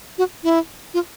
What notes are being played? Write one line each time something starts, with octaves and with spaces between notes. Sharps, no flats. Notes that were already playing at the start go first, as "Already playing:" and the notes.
F#4
E4
F4